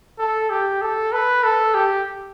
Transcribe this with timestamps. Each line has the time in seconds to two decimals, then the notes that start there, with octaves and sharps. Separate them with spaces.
0.19 A4
0.50 G4
0.81 A4
1.12 B4
1.43 A4
1.74 G4